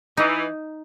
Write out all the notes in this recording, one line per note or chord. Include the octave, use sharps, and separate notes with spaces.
E3 D#4